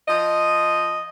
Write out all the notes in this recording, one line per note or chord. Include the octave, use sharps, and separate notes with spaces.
F3 D#5